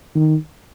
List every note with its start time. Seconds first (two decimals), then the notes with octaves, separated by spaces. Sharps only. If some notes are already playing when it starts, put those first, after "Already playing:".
0.15 D#3